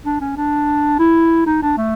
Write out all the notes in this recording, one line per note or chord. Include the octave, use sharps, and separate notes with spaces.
D4
C#4
D4
E4
D#4
D4
A3